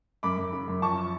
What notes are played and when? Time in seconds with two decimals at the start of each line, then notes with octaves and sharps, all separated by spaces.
0.23 F#2 B5 D6
0.38 F#2
0.52 C#3
0.68 F#2
0.82 F3 A5 C#6